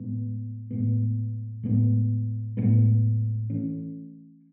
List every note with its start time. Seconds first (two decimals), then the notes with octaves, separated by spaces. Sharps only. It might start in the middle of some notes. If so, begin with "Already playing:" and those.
Already playing: A2 G#3 B3
0.71 A2 G#3 B3
1.63 A2 G#3 B3
2.57 A2 G#3 B3
3.50 E3 A3 C#4